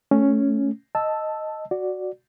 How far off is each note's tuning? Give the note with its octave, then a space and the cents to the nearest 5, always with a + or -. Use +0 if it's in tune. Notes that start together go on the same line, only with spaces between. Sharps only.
A3 -5 C#4 +0
D#5 +0 A5 +0 E6 +0
F#4 +0 D5 +0